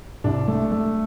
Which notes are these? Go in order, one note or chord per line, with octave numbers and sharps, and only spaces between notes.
C2 D4
A3
A3